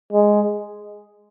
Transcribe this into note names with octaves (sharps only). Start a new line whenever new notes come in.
G#3